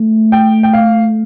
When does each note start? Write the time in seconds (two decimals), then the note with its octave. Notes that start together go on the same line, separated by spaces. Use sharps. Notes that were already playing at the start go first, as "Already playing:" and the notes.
Already playing: A3
0.32 G5
0.63 G5
0.73 F5